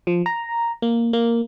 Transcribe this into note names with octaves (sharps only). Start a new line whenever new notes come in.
F3
A#5
A#3
A#3